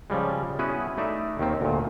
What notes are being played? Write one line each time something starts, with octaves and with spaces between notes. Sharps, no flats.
C#3 F3 G3 G#3
B3 C#4 E4 F#4 G#4 B4
A3 D#4 D5 E5
D#2 D#3 C4
D2 A#2